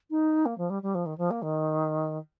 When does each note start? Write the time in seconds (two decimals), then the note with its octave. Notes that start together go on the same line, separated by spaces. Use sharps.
0.10 D#4
0.45 A#3
0.58 F3
0.70 G3
0.82 G3
0.95 F3
1.06 D#3
1.18 F3
1.30 A#3
1.42 D#3